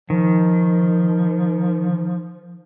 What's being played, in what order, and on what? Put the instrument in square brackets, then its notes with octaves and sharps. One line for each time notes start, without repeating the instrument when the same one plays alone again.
[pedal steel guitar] D#3 [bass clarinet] F3